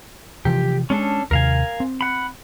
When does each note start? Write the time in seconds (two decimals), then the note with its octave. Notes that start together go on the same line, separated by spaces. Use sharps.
0.45 C3 E3 F3 G4
0.90 G#3 C#4 D4 A4
1.31 D#2 C3 A#4 F5 G#5
1.80 C4
2.01 F#5 B5